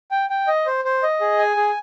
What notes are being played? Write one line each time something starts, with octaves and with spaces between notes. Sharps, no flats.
G5
G5
D#5
C5
C5
D#5
G#4
G#5
G#4